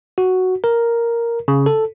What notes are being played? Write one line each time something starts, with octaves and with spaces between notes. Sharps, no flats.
F#4
A#4
C#3
A4